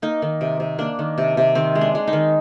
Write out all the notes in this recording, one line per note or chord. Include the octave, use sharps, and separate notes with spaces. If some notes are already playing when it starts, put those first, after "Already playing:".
A#3 D#4
D#3
C3
C3
A#3 D4
D#3
C3
C3
D#3 C4
G#3
D4
G#3
D#4
D#3